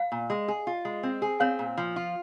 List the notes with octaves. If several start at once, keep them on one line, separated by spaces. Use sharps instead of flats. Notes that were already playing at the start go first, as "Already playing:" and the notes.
Already playing: F5
A#2
G#3
G#4
F4
G#3
C4
G#4
C4 C#5 F5
A#2
F3
F4